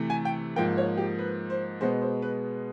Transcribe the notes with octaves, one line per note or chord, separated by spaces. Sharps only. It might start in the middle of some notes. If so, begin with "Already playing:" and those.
Already playing: C3 E3 A3
G#5
G5
G#2 F3 A#3 G5
C#5
G4
B4
C5
B2 G#3 B3 C5
C5
B4